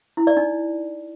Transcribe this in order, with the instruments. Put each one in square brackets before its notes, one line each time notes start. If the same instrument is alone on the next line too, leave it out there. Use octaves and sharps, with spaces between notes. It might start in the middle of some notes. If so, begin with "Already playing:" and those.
[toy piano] E4
D5
D#4